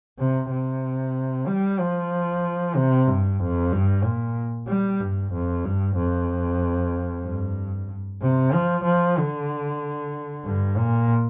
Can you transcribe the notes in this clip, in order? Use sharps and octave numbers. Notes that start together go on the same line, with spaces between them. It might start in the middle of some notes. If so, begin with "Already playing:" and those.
C3
C3
G3
F3
C3
G2
F2
G2
A#2
G3
G2
F2
G2
F2
G2
C3
F3
F3
D3
G2
A#2